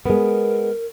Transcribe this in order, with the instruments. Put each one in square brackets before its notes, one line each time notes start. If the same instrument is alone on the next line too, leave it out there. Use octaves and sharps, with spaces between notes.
[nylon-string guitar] G#3 B3 [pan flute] A#4